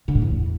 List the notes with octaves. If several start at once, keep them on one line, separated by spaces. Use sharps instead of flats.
D3
A2
E2